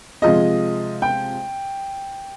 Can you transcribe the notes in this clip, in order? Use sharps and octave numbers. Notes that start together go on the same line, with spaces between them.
C3 F3 G#3 D#5
G5